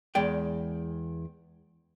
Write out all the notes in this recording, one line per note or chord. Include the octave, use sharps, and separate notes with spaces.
E2 G#3 D5 G5